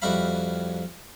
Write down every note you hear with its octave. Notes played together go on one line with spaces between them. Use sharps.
F2 G3 F#4 E5 F5 B5